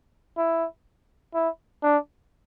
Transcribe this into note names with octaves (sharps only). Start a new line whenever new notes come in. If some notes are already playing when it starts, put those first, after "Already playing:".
E4
E4
D4